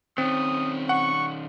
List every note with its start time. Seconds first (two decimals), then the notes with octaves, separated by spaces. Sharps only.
0.18 D#3 C4 C#4 D#6
0.89 F#5 C#6